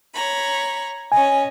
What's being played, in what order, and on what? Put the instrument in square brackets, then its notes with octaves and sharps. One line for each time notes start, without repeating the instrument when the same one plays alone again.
[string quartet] C#5 A#5 B5
[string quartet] C#4 D#5 [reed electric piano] G#5